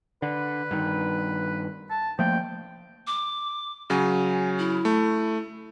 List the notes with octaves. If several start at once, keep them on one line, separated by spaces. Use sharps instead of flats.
D3 B4
G2 D#3
A5
F3 A3 A#3 G5
D6
C#3 F#3 G#5
E4
A3